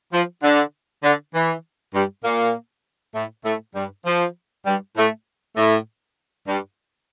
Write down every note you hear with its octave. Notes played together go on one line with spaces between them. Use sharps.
F3
D3
D3
E3
G2 G3
A#2 A#3
A2 A3
A2 A3
G2 G3
F3
G2 G3
A2 A3
A2 A3
G2 G3